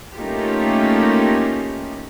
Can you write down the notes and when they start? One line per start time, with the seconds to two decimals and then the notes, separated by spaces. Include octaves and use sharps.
0.14 A3 A#3 C#4 D#4 F4 G4